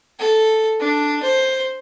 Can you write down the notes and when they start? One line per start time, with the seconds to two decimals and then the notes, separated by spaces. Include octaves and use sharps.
0.20 A4
0.80 D4
1.23 C5